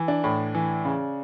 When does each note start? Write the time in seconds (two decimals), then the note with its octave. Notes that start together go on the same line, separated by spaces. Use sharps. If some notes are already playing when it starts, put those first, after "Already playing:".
Already playing: E3
0.08 D4
0.24 A2
0.55 E3
0.85 C#3